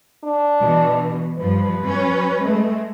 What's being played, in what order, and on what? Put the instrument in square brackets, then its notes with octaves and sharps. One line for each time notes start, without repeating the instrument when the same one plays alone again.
[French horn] D4
[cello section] B2 E3
[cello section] G2 F3 [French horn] B4
[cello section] F#3 C#4
G#3 A3